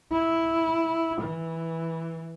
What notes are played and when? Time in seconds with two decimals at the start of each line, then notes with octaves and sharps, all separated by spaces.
0.12 E4
1.21 E3